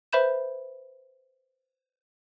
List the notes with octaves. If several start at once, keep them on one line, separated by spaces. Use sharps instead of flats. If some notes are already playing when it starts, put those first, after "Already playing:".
B4 C5 E5 B5 G6 E7